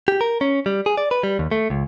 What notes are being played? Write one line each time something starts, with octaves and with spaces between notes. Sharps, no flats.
G4
A#4
C#4
G3
G#4
D5
B4
G3
D#2
A3
C#2